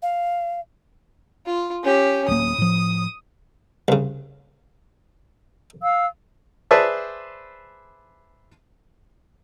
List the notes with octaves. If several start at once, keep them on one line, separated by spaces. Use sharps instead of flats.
F5
F4
C#4 G4
D1 A#3 D#6
A2 F3
C2 C#3
F5 E6
G#4 B4 C5 D5 E5 A5